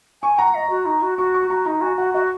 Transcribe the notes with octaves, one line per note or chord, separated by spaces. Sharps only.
G#5 C#6
F#5 A#5
D#5
F#4
D#4
F#4
F#4 C#6
C#6
F#4 A#5
D#4 A#5
F#4 G#5
F#4 F#5
F#4 D#5